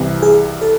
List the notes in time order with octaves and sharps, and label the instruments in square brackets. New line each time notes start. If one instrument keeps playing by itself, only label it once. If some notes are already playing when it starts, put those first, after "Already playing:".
Already playing: [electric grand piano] C2 C3 E3
[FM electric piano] G#4
A4